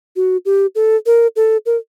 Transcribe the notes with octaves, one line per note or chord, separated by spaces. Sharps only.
F#4
G4
A4
A#4
A4
A#4